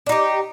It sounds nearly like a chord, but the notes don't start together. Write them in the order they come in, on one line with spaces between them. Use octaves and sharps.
D4 D#4 G4